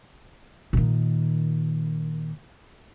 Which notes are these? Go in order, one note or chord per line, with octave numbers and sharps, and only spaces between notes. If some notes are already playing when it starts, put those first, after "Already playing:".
A#2 D#3